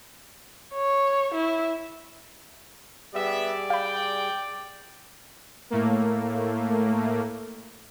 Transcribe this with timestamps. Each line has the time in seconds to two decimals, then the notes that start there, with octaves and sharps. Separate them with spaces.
0.74 C#5
1.34 E4
3.14 G3 B3 G4 G#4 D5 E5
3.70 F5 G5 B5
5.70 A2 A3 A#3